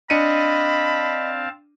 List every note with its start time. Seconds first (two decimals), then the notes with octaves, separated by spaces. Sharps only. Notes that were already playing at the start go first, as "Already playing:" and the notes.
0.10 C4 D4 D#5 F5 A5 B5 C#7 D#7